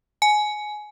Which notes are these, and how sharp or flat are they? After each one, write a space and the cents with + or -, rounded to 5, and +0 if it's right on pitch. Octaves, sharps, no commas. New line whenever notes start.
G#5 +20